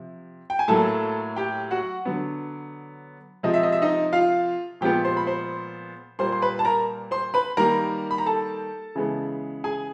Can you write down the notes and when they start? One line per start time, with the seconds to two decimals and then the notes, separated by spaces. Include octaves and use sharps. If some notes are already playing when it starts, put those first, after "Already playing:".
Already playing: C3 F3
0.50 G5
0.59 G#5
0.68 A2 F#3 A#3 A4 A5
1.36 G4 G5
1.71 F#4 F#5
2.05 D3 F#3 B3
3.43 C3 F3 G#3 D#5
3.54 E5
3.63 D#5
3.72 E5
3.82 D#4 D#5
4.13 F4 F5
4.81 A#2 F3 G#3 B3 G4 G5
5.05 C5 C6
5.17 B5
5.27 C5 C6
6.19 A#2 G3 A#3 C5 C6
6.32 C6
6.42 B4 B5
6.59 A5
6.65 A#4 A#5
7.11 C5 C6
7.34 B4 B5
7.57 D#3 G3 A#3 A#4 A#5
8.11 B5
8.18 A#5
8.26 A4 A5
8.95 C#3 E3 G#3 B3
9.64 G#4 G#5